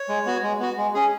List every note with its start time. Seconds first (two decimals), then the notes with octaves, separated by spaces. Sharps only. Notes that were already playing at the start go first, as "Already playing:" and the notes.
Already playing: C#5
0.09 G#3
0.26 B3 F#4
0.43 G#3
0.60 B3 F#4
0.77 G#3
0.94 C#4 G#4